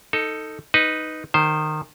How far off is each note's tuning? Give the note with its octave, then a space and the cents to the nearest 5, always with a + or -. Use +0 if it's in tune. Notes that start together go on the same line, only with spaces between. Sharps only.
D#4 +5 A4 +15
D#4 +0 B4 +0
D#3 -20 C5 +0